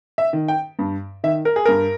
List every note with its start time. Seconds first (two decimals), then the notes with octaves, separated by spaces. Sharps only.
0.18 E5
0.33 D#3
0.48 G5
0.79 G2
1.24 D#3 E5
1.45 A#4
1.56 G#4
1.66 G2 A#4